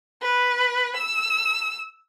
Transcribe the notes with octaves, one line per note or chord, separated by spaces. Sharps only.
B4
E6